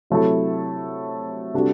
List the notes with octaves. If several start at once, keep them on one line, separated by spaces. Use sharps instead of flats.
C3 F#3 A3 E4 A4
C3 G3 D4 F#4 A4